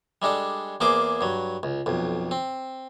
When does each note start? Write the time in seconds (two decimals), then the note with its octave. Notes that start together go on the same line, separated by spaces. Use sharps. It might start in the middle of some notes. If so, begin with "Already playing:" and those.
0.22 G3 G#3 D4 A4
0.80 E2 A#3 G#4 C5 D6
1.21 G2 F#3
1.63 C#2
1.86 B1 F2
2.31 C4